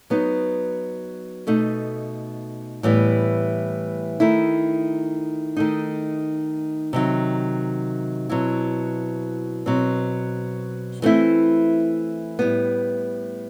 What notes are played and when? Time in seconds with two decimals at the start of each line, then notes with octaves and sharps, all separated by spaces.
0.10 F#3 B3 D#4
1.47 B2 A3 D#4
2.83 A2 E3 G3 B3
4.20 D#3 A3 E4
5.56 D#3 A3 D#4
6.93 C3 D#3 F#3
8.29 B2 F#3 C4 E4
9.66 B2 F#3 C4
11.02 E3 A3 C4 E4
12.39 A2 G3 B3